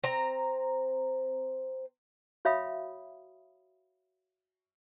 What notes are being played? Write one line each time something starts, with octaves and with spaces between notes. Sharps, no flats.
C4 A#5
F#4 C#5 E5 F5 B5 D#6